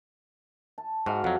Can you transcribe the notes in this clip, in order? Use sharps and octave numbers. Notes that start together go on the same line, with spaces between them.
A5
G#2 F#4 F5
F2 F#3 F#5